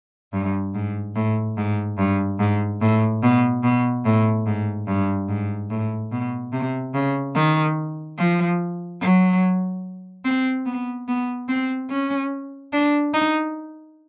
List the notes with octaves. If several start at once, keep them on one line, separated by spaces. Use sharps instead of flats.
G2
G#2
A2
G#2
G2
G#2
A2
B2
B2
A2
G#2
G2
G#2
A2
B2
C3
C#3
D#3
F3
F#3
C4
B3
B3
C4
C#4
D4
D#4